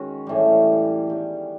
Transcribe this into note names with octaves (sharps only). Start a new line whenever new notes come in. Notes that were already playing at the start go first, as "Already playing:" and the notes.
Already playing: D#3 G#3 C#4 F#4
A2 E3 G3
D#3 G3 B3